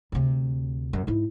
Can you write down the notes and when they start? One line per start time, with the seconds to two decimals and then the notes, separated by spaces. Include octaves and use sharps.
0.12 D2 C3
0.93 F#2
1.07 G#2 E4